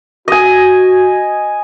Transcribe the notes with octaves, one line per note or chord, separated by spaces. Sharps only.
F#4 D#5 G#5